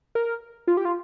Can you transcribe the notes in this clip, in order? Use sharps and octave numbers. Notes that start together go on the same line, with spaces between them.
A#4
F4
G4
F4